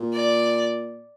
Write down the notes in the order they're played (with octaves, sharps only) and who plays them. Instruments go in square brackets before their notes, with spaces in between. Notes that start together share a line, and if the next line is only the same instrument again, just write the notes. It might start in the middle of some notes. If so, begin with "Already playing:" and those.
Already playing: [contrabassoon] A#2
[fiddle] D5